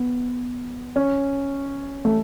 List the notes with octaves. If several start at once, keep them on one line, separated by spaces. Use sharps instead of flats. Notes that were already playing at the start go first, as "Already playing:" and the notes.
Already playing: B3
C#4
A3